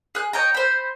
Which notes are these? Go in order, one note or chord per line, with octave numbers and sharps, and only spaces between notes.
G#4 F#6
C#5 D#5 G5 A#5
C5 B5